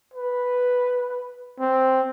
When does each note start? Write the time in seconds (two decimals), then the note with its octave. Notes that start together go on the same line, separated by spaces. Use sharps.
0.14 B4
1.60 C4